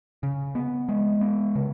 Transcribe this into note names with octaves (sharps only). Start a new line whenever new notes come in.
C#3
B3
G#3
B3
C#3